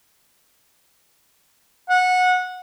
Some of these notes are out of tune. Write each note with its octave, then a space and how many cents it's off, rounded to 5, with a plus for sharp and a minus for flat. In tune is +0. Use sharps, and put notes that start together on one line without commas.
F#5 -20